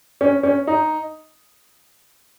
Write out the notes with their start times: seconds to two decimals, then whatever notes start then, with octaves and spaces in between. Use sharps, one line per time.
0.21 C#4
0.43 C#4
0.67 D#4